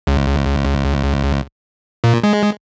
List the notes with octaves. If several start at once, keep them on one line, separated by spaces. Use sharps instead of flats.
C#2
A#2
G#3